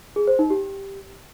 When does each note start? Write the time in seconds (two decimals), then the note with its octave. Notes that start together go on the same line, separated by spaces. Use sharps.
0.16 G#4
0.27 C5
0.39 D#4
0.50 G4